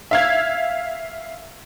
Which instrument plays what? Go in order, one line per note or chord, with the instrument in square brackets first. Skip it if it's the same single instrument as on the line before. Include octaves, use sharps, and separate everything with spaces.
[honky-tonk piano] E5 F5 G#6